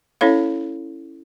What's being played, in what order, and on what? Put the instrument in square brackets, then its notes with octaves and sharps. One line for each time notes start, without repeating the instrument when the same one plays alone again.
[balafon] C#4 E4 A4 C#5 F5